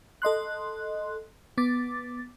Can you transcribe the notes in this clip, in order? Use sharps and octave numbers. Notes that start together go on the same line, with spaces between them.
A4 D#5 C6 F#6
B3 D6 A6